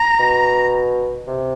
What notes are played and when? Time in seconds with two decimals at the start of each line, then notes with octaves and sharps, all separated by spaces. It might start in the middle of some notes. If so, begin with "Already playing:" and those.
Already playing: A#5
0.20 B2
1.28 C3